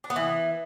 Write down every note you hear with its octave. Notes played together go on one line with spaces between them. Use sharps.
D4
B3
E3